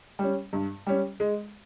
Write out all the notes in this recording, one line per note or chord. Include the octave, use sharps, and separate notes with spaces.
G3 C#4
G2
G3 C#4
G#3